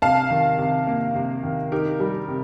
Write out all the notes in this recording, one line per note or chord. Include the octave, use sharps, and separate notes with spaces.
C3 F5 A5
D#3
C3
A#3
C3
D#3
D#4 G4 A#4
G3
C3